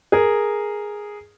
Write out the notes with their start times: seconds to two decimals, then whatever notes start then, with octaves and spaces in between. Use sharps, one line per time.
0.12 G#4 A#4